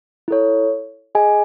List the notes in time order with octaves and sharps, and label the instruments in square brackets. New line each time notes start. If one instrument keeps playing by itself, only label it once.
[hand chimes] E4 A4 C#5
G#4 D#5 G#5